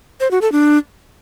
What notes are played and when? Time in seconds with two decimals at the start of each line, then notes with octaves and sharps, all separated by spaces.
0.20 C5
0.31 F#4
0.42 A4
0.52 D4